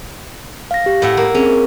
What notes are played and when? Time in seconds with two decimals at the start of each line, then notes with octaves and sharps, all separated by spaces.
0.71 F5 A#6
0.86 G4
1.02 A2 E5 F#5
1.17 A#3
1.35 C4 C#4 G#4